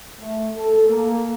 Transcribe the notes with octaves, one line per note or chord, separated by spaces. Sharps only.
A3
A4
A#3